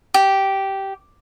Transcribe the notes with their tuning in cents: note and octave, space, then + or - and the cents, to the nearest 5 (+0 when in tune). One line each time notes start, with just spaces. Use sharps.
G4 -10